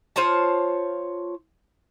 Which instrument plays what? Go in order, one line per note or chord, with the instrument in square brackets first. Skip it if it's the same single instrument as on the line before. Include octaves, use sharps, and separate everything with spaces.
[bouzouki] F4 C5 C#5 A5